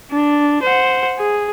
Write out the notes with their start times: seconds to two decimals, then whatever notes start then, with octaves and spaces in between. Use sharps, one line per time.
0.12 D4
0.63 C5 F#5
1.19 G#4